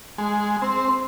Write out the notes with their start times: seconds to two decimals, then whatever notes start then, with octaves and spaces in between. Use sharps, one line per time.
0.18 G#3
0.62 C4